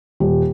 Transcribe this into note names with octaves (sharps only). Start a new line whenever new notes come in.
D#1